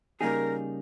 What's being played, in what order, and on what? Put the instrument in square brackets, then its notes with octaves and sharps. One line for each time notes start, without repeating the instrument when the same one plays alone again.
[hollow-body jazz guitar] C#3 G3 A#3 D#4 G#4 [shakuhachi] A#4